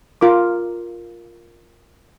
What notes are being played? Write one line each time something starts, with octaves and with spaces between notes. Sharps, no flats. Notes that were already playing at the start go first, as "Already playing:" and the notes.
F4 A#4 D6